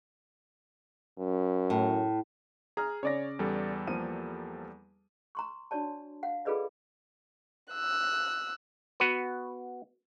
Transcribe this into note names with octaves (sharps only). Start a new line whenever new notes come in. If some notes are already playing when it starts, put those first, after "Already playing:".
F#2
A2
G#4 A#5 F6
C#3 C#5 D5 A#6
E2 G3 A4
F3 A#3 D#7
A#5 C6 C#6
D4 F#4 C#5 D5 A5
F5 F#5
F4 G#4 A4 B4 D5 D#5
E6 F#6
B3 F#4 B4